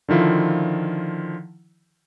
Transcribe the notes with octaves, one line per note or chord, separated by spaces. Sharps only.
D3 D#3 F3 E4 F4